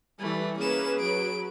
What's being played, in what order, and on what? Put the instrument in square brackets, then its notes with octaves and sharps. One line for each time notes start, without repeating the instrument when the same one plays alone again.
[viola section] E3 G3 [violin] A3
[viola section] A#3 B4 [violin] C#4 E7 [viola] G#4
[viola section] F#3 B4 [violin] D7